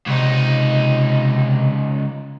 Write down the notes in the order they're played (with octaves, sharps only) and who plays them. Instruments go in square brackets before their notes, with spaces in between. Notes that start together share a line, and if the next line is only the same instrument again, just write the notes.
[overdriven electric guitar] C#2 D#4 [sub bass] C3